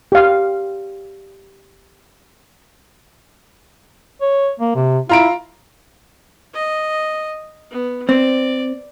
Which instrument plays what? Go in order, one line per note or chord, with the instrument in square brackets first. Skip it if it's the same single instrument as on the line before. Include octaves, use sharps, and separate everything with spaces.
[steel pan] G4 F5
[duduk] C#5
A#3
C3
[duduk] E4 [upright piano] F4 A#5 D7
[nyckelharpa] D#5
B3
[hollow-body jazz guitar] C4 [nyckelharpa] D5